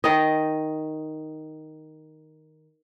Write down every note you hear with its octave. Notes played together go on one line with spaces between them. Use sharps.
D#3 D#5